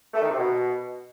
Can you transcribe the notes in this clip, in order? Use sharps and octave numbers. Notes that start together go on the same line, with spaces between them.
A3
D#3
C3
B2